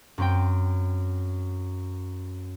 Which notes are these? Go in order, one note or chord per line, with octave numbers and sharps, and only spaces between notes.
F#2 C4 G5